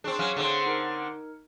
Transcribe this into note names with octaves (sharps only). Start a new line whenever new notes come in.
C4 D4 G#4 C#6
F#3 C#4 C#5 F5
D3 C4 G#4 C5
D#4 A#4 C#7